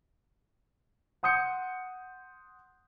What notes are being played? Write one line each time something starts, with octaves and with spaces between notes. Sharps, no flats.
F#5 C6 D#6 G6 C#7